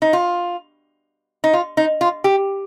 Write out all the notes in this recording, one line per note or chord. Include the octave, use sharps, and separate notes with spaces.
D#4
F4
D#4
F4
D#4
F4
G4